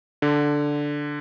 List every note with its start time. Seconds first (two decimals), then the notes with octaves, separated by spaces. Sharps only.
0.22 D3